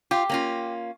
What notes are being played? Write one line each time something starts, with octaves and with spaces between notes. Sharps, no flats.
F4 G4
A#3 C#4 F4